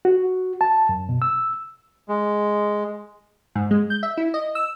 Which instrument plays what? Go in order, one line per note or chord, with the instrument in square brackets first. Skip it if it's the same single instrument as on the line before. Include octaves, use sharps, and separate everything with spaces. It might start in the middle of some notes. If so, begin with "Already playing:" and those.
[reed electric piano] F#4
A5
F#2
B2
E6
[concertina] G#3
[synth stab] G#2
G#3
G6
E5
E4
D#5
E6